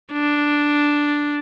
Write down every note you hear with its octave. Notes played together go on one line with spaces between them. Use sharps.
D4